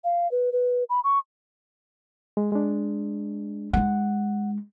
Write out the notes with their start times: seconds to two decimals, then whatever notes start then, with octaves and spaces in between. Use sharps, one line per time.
0.04 F5
0.31 B4
0.52 B4
0.89 B5
1.04 C#6
2.37 G#3
2.52 G#3 D4
3.73 G#3 D#4 F#5